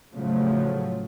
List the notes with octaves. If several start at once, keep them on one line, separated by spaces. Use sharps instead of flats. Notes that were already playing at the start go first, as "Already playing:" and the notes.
A2 C#3 F3 F#3 A3